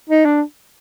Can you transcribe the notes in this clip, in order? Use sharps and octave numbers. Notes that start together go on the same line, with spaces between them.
D#4
D4